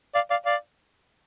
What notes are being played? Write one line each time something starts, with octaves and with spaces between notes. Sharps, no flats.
D5 F5
D5 F5
D5 F5